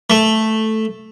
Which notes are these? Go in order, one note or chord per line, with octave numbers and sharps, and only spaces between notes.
A3